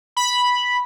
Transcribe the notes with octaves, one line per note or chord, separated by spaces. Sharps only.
B5